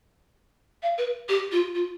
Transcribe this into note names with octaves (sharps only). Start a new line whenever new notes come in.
F5
B4
G4
F4
F4